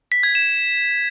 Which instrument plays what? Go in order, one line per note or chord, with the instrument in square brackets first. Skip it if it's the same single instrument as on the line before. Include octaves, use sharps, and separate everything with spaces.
[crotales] B6
G#6
E7